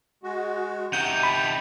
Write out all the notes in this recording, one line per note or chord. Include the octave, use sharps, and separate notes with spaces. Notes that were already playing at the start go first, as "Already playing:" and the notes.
G#3 F#4
C3 D#4 F#5 G6
A5 B5